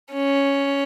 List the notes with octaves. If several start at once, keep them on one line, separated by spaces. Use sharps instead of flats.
C#4